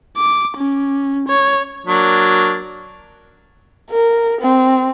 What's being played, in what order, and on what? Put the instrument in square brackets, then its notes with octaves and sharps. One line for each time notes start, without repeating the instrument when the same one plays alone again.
[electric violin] D6
C#4
C#5
[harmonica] F#3 A#3 D4
[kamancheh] A#4
C4